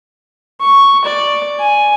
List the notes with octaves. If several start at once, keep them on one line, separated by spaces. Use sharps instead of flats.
C#6
D5
G#5